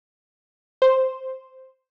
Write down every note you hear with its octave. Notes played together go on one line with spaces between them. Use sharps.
C5